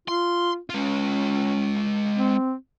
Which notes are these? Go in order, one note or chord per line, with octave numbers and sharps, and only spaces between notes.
F4 C6
G#3 C#4 F4
C4